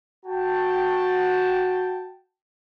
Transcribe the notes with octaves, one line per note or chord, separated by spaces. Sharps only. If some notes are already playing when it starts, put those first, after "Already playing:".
F#4 G5 A5